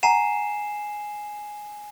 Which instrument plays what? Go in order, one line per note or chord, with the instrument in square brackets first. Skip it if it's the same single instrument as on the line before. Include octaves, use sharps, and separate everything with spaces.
[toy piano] F#5 A#5 [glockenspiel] G#5 C7 E7